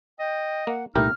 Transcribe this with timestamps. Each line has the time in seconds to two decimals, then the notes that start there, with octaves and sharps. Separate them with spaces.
0.19 D#5 G5
0.67 A#3 F#5
0.95 C2 A#2 A3 D#4 E4 G4 A#4 F6